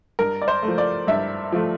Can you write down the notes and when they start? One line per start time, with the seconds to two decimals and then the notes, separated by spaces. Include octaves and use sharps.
0.19 G2 A#4
0.42 D5
0.48 C5
0.63 A3
0.68 F3
0.78 D5
1.07 G2 E5
1.52 F3 A3